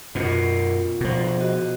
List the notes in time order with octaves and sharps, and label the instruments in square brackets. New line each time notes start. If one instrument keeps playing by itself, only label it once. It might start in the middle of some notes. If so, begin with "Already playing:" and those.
[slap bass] F#2 B2 [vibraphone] F4
[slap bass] B2 F3
[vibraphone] F#4 D#5